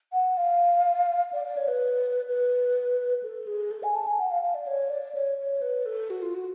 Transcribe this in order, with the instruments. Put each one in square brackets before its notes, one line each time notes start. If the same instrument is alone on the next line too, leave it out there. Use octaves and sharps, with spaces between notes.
[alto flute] F#5
F5
D5
D5
C#5
B4
B4
A4
G#4
A4
G#5
A5
G#5
F#5
F5
F5
D5
C#5
D5
C#5
C#5
B4
A4
F#4
F4
F#4